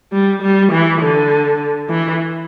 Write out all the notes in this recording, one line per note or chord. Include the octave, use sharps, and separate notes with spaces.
G3
G3
E3
D3
E3